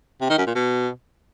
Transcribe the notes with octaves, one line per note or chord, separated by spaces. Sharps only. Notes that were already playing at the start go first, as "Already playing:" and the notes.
C3
D#3
F#2
A#2
B2